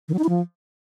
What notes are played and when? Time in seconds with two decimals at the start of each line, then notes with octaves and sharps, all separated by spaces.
0.08 D#3
0.14 F#3
0.19 D#4
0.24 E4
0.29 F3